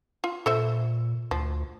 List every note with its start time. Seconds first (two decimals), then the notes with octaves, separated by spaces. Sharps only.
0.24 F4
0.46 A#2 A4 C5 E5
1.31 D2 F3